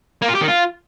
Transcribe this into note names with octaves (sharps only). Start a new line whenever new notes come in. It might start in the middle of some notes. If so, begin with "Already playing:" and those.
A#3
F4
G4
D#3
F4